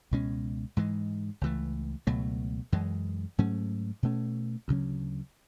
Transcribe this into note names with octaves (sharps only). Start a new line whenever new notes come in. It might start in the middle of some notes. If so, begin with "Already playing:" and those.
C#2 B2 G#3 C#4
G#2 E3 G#3
C#2 C#3 E3 A3
C#2 B2 F#3 A3
F#2 E3 G#3
G#2 F#3 A3 C#4
B2 A3 C#4
D2 C#3 F#3 C#4